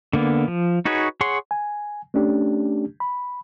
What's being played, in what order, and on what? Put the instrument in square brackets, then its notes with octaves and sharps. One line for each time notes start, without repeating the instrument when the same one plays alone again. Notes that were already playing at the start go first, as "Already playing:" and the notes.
[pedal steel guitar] D3 A#3 B3
F3
D#4 F#4 G#4 B4 C#5
G#4 C#5 F#5 C6
[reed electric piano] G#5
A3 C#4 D4 G4
B5